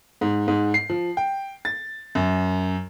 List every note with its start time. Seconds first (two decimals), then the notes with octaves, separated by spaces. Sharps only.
0.21 G#2
0.48 G#2
0.74 C7
0.90 F3
1.17 G5
1.65 A6
2.15 F#2